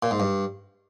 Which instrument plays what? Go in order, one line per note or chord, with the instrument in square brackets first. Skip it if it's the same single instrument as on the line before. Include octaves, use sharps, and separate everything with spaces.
[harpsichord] A#2
G#2
G2